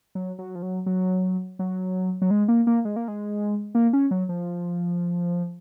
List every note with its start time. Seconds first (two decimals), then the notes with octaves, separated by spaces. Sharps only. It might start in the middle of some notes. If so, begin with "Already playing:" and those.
0.15 F#3
0.39 F#3
0.55 F3
0.62 F#3
0.86 F#3
1.59 F#3
2.22 F#3
2.31 G#3
2.48 A#3
2.67 A#3
2.85 G#3
2.96 A#3
3.08 G#3
3.75 A#3
3.93 C#4
4.11 F#3
4.29 F3